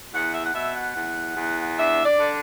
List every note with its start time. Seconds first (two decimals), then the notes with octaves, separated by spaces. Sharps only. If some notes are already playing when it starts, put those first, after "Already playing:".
0.13 E2 F#5
0.34 E5
0.46 F#5
0.54 B2 E5
0.75 F#5
0.95 E2
1.36 E2
1.78 D4 E5
2.05 D5
2.19 D3